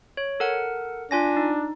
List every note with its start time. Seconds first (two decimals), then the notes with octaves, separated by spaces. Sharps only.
0.17 C#5
0.40 A4 A#4 F#5
1.11 D4 F4 G#5 A#6
1.37 D#4